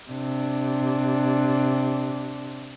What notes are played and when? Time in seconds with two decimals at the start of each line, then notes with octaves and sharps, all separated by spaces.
0.10 C3 D4